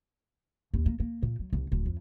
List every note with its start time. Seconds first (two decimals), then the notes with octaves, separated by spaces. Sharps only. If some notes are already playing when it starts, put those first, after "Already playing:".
0.74 D#2
0.86 A#3
1.00 A#3
1.22 A#2
1.39 F#3
1.53 C2
1.72 D1
1.86 F2